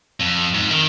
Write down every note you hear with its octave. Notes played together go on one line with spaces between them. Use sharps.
F2
G#2
D#3